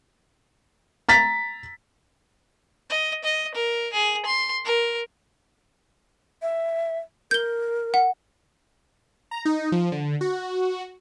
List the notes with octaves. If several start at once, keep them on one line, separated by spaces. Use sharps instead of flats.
A#5 A6 B6
D#5
D#5
A#4
G#4
C6
A#4
E5
A#4 G6 G7
F#5
A#5
D#4
F3
D3
F#4